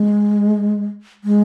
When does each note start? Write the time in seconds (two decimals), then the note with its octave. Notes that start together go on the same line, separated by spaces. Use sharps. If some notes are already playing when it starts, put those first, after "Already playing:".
Already playing: G#3
1.24 G#3